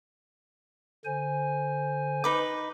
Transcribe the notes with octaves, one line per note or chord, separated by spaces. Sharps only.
D3 C5 G#5
D#4 B4 D6